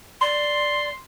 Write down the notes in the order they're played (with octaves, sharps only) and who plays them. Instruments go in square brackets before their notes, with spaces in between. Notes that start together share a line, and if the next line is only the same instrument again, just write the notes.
[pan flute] D5 [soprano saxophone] C6